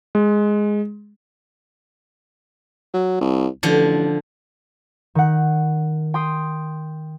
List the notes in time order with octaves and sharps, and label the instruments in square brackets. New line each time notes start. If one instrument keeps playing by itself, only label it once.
[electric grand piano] G#3
[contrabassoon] F#3
C2
[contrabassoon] A1 [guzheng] D3 F3
[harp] D#3 F#5
G5 C6 D#6 C7